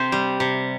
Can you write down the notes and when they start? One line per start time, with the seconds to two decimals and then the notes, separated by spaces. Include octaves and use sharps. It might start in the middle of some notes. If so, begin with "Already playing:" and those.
Already playing: C3 C4 C5
0.12 G3
0.40 C3